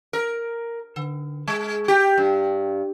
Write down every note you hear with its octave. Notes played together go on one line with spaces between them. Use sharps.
A#4
D3
G#3
G4
G2